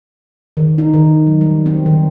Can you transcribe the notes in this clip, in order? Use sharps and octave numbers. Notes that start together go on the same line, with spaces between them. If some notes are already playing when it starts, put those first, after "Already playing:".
D#3
D#4
D#3
F#3
G3
C4
D#3